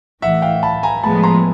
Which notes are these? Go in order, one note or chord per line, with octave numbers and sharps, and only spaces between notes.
A1 A2 E3 E5 F#5
F5 G5
A5 B5
G#5 A#5
A2 F3 G#3 B3 A5 B5
A#5 C6